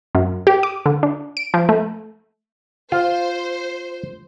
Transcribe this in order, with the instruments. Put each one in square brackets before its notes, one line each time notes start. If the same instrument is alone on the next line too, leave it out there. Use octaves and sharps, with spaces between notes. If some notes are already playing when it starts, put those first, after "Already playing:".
[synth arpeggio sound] F#2
G4
D6
D3
D4
D7
F3
A3
[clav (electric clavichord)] F4 [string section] C5